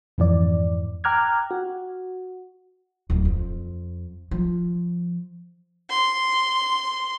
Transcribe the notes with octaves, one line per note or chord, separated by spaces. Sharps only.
F2 G#2 E3 D5
G5 A#5 D6 F6 F#6 G#6
F#4
D1
F2
F3
C6